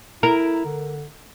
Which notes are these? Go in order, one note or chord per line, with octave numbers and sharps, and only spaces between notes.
E4 A#4
D3